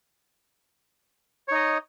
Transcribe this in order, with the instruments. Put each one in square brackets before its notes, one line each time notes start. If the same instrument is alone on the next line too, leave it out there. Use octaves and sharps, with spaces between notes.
[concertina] C#5
D#4
D#5